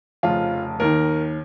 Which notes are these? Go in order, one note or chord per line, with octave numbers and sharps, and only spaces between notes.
F1 F2 C#3 F3 F4
D#2 D#3 A#4